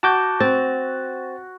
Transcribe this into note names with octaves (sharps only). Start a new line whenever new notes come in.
F#4 A5 D6 G6
C4 A6